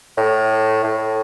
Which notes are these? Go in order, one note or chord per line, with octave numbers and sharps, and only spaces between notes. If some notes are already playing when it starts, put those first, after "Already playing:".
A2
A2